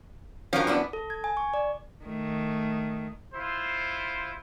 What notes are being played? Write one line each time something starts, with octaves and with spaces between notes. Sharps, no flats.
G2 F3 C#4 F#4 A#4
B3 D4 E4
A4
G#6
G#5
C#6
D5
D#3 A3
E4 F4 C5